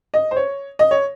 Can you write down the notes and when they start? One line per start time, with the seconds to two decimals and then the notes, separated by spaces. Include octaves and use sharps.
0.14 D#5
0.31 C5
0.36 C#5
0.79 D#5
0.91 C#5